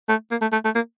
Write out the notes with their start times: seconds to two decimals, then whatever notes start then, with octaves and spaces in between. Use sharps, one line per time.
0.09 A3
0.31 A#3
0.42 A3
0.52 A3
0.65 A3
0.75 A#3